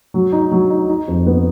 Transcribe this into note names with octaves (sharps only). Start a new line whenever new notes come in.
F#3
D#4
F#3
D#4
D#4
F2
B3